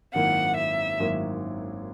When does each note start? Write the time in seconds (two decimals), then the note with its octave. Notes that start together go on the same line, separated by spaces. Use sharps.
0.14 G#1 F#2 D#3 A#3 E4 F#5
0.57 E5
1.00 G#1 F#2 D#3 A#3 E4